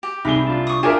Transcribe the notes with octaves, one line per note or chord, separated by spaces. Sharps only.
G4
C2 D#4 G4 G#4 B5 G7
D4 F4
C#6 D#6
D4 F4 G4 G#4 A#4 C#5 E5 G5